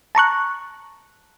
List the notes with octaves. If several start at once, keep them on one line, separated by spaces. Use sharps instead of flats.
A5 A#5 C#6 F#6